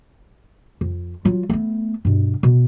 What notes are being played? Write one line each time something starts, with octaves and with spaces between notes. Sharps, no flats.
F2
F#3 F4
A3 B3
G2 B2
B2